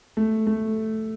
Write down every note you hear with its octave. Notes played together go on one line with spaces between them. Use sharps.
A3
A3